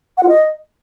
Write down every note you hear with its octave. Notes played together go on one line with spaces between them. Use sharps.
F#5
F4
D#5